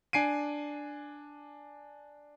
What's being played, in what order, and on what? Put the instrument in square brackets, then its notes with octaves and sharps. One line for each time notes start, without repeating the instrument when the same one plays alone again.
[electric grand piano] D4 G#5 C7 D7 D#7